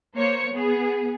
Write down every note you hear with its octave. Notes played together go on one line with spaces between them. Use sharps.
A#3 C5 C#5 C#7
B3 G#4